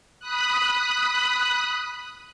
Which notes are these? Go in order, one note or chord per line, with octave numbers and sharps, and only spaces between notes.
B5 D#6 F#6